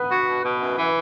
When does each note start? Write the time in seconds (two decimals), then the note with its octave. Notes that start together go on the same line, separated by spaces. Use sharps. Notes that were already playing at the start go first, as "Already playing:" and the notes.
Already playing: B3 B4
0.09 F#4
0.26 B2
0.42 B2
0.60 F#2
0.76 E3